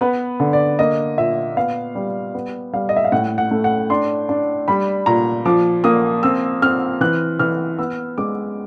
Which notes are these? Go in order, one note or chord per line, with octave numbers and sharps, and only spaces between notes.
B3 B4
D3
D5
A#3 D#5
A#2 E5
B3 F5
G3
B3
G3 F5
D#5
E5
F5
A2 F#5
F#5
A3
F#5
D4 C6
D4
G3 B5
A#2 A#5
F3 D6
A#3 D#6
C4 E6
C4 F6
E3 F#6
E3 F6
B3 E6
G#3 D6